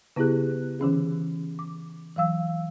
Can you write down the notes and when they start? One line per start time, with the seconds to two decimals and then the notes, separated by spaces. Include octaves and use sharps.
0.16 C#3 B3 E4 G4 G#4 F#6
0.79 D3 E3 C#4 G#4
1.59 D6
2.16 E3 F#3 F5 E6